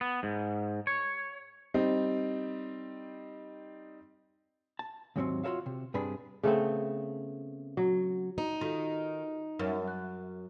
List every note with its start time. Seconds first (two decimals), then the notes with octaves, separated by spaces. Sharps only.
0.01 B3
0.23 G#2
0.87 C#5
1.74 G3 C4 D#4
4.79 A5
5.16 D#2 G#2 C3 F#3 A#3 C4
5.44 F4 F#4 A#4 C#5 E5 F5
5.66 C3
5.94 G2 C3 D4 G#4 B4 B5
6.43 C#3 A3 B3 C4
7.77 F#3
8.38 D#4
8.61 D#3 F4 F#4 A4
9.59 F#2 A#4 C#5 E5
9.88 F#6